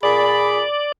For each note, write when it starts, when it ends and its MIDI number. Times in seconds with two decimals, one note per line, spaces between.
0.03 0.62 46
0.03 0.63 68
0.03 0.92 74
0.03 0.62 83